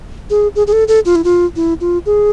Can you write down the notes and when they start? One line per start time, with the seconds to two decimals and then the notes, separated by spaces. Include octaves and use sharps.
0.30 G#4
0.55 G#4
0.67 G#4
0.72 A4
0.88 A4
1.05 F4
1.15 E4
1.24 F4
1.56 E4
1.81 F4
2.06 G#4